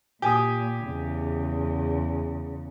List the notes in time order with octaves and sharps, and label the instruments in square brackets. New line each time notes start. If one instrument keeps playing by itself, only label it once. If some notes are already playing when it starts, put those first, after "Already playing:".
[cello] A#2 [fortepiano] G4 G#5 D#6
[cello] E2 C#3